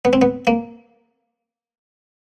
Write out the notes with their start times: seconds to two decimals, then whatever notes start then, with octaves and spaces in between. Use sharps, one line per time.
0.05 B3
0.13 C4
0.22 B3
0.47 A#3